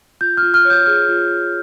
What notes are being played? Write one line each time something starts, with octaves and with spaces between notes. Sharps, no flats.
F4 G6
F6
F4
F6
C#5
G6
G#4 F6
F4
F4